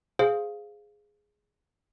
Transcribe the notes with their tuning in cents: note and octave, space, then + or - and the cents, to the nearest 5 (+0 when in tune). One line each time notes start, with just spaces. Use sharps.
G#4 +0 C5 +0 F5 +0